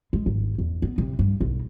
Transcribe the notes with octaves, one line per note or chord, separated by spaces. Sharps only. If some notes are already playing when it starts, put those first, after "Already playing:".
G#3
G#1
E2
B3
C3
G2
B1